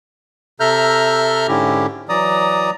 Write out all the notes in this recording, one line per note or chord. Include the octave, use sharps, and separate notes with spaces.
C3 A4 E5 A#5 F6 G6
G#2 D3 C#4 E4 G4
E3 F#3 D5 A#5 D#6